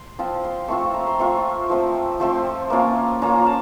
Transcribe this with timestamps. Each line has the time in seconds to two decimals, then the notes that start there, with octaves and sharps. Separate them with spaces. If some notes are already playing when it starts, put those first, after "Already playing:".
Already playing: C6
0.19 F3 C4 F4
0.44 C6
0.68 A3 C4 F4 C#6
0.81 C#6
0.94 A#5
1.07 C6
1.19 A3 C4 F4 C#6
1.69 F3 A3 C4
2.20 F3 A3 C4 C6
2.70 A#3 C#4 F4
3.22 A#3 C#4 F4 A#5
3.47 A5